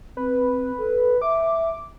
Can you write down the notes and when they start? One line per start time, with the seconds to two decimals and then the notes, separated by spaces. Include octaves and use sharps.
0.17 C4 B4
0.78 A4
1.22 E5 D6